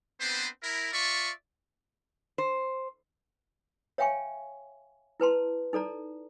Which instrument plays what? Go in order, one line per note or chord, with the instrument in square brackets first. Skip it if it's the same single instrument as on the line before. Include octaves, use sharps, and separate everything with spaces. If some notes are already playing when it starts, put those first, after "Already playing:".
[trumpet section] B3 C4 D4 B4 C5
E4 A#4
F4 D5 E5 C#6
[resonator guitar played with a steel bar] C5
[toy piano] C#5 E5 F5 G5 G#5 C#6
E4 B4 A5 C6
D#4 A4 D5 A#5